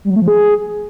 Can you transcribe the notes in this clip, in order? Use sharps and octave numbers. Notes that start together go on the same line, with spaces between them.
G3
F#3
A3
F3
G#4